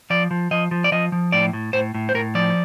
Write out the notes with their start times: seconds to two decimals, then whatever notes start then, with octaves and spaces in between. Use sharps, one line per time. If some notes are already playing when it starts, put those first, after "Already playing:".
0.10 F3 D5
0.31 F3
0.51 F3 D#5
0.71 F3
0.84 D5
0.92 F3 D#5
1.12 F3
1.32 A2 D5
1.53 A2
1.73 A2 C5
1.95 A2
2.09 C5
2.14 A2 A#4
2.35 F3 D5